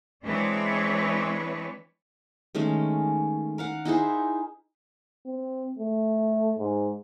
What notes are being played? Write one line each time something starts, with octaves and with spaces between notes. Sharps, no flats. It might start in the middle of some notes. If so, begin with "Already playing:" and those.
E3 G#3 C4 D4 B4 C#5
D#3 G#3 A3 C#4
A#4 F5 F#5
D#4 E4 G#4 C5
C4
A3
G#2